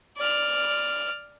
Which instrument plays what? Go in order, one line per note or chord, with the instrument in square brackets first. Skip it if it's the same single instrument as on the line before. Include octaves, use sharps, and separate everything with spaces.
[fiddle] D5 F6